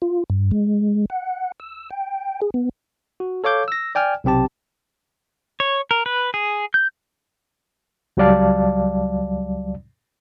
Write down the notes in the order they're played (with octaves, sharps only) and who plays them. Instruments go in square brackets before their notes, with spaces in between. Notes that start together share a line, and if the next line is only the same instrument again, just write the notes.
[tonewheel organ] F4
G2
G#3
F#5
E6
G5
G#4
B3
[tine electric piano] F#4
A4 C#5 F5 D6 G6
E6 A#6
D5 G5 G#5 F6
B1 C3 C4 G4 A5
[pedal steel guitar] C#5
A#4
B4
G#4
G6
[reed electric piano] C#2 F#3 G3 D5 F5 A5